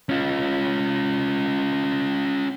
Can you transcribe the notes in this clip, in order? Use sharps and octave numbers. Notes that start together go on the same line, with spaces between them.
C#4 F4